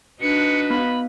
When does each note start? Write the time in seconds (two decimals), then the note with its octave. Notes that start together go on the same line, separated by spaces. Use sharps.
0.22 D4 D#4 F#4 B4 C#7
0.70 B3 B5